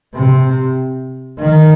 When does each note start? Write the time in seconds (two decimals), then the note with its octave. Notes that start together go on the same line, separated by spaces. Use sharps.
0.15 C3
1.41 D#3